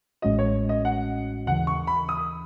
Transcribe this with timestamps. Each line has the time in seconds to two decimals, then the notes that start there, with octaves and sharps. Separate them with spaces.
0.22 A1 A2 G#3 C#4 F#4 D#5
0.39 C#5
0.69 D#5
0.85 F#5
1.46 D#2 C#3 E3 F#5
1.67 C#6
1.87 B5
2.09 D#6